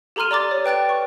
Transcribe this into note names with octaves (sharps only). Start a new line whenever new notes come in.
G4 A4 A#5 C6 F6 D#7
D5 A#5 D6 A6
C#5
B4 G5 F#6 A6 D7
C#6